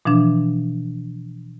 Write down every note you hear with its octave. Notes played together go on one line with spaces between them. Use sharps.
B2 E3 F3 D4